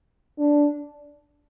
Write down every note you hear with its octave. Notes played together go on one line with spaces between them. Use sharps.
D4